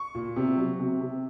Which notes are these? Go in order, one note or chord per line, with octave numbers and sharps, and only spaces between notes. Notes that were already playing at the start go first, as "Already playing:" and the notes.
Already playing: C#6
A#2
C3
F#3
C3
C3